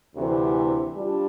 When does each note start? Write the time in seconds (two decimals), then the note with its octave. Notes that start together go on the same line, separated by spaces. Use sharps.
0.16 D2 C3 E3
0.95 G3 D4 F4